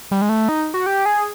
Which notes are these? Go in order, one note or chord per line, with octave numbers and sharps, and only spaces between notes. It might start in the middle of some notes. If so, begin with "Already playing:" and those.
G3
G#3
A3
D#4
F#4
G4
G#4